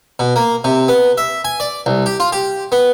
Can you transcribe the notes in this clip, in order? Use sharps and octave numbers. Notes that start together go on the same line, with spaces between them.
B2
A#3
C3
B3
E5
G#5
D5
C2
G4
F4
G4
B3